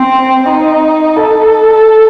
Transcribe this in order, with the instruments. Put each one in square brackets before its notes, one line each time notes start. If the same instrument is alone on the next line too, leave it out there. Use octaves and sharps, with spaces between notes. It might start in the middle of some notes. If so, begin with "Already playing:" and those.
Already playing: [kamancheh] C4
D#4
A4